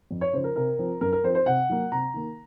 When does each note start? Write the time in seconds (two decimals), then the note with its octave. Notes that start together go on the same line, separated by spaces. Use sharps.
0.11 F2
0.21 C#5
0.33 C#3 F3 C5
0.44 A#4
0.56 C3 A#4
0.79 F3 C4
1.01 F#2 A#4
1.13 A#4
1.23 F3 C4 C5
1.35 C5
1.46 C3 F#5
1.69 F#3 A#3
1.92 C3 A#5
2.14 D#3 A#3